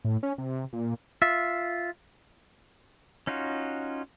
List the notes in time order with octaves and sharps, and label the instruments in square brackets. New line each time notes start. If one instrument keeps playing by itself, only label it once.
[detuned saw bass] A2
C#4
C3
A#2
[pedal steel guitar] F4 E5
C#4 D#4 F4 F#4